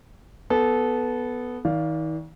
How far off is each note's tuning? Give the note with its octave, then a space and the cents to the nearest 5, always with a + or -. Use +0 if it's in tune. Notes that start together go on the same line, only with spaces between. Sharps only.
B3 +0 A4 -20
D#3 +40 D5 -15 F5 +0